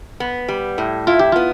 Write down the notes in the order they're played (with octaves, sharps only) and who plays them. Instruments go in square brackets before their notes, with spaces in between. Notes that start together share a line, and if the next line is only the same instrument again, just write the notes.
[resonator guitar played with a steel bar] B3
G3
A2
[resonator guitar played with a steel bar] E4 [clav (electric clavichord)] F4
[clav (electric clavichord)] G4
[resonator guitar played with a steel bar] B3 [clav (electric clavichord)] F4